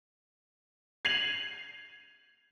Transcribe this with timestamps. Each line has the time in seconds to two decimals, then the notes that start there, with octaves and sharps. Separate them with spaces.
1.05 G#6 C7 D#7 F7 F#7